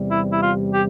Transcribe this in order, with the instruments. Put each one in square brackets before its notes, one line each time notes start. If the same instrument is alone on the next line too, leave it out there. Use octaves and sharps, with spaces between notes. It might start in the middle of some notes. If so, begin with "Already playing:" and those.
Already playing: [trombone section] E2 C3 G3
[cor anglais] E4
E4
F4
G4